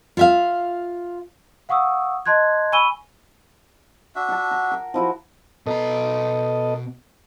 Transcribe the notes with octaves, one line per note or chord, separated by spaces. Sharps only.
F4 E5 F5
F5 F#5 C#6 D#6 E6
D#5 A5 C6 F#6 G#6
G#5 B5 C#6 E6 D#7 G7
D4 F#4 E5
F#5 A5
A#5
A#4
F3 E4 F#4
B2 B3 A4 D#5 A#5